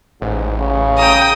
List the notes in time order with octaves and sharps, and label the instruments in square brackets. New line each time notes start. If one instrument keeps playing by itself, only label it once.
[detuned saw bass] A1 [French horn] G#2
[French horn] C#3
[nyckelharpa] G5 A#5 [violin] D#6